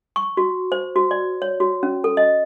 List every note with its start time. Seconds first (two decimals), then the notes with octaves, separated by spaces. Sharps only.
0.16 C#6
0.37 F#4
0.72 C5
0.96 F#4
1.11 D5
1.42 C#5
1.60 F#4
1.83 C#4
2.04 A4
2.17 D#5